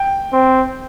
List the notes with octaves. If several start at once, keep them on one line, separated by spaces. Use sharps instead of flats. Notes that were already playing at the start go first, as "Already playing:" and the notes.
Already playing: G5
C4